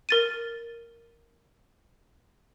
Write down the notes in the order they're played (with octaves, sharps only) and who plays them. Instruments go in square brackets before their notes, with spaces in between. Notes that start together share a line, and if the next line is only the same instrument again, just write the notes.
[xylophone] A#4 A6 D#7